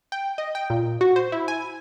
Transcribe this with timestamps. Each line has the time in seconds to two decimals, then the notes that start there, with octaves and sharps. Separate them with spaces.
0.12 G5
0.38 D#5
0.55 G5
0.70 A#2
1.01 F#4
1.16 C5
1.32 E4
1.48 G#5